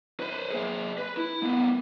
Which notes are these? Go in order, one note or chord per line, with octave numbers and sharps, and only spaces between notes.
B4 C5
A#3 G#4
B4
E4
A3 B3